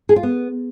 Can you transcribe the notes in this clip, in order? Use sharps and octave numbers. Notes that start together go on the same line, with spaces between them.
G#4
F4
B3